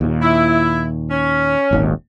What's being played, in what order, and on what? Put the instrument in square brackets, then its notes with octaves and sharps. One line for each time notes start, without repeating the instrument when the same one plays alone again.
[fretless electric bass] D#2 A#2
[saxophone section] E4
C#4
[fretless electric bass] D#1 G#1 D#2